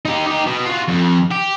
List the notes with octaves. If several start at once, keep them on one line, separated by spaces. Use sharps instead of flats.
D#4 G4
D#4 G4
B2
F4 F#4
F2
G4